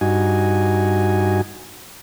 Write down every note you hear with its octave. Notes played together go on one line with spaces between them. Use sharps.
G2 D#4 F#4 G#5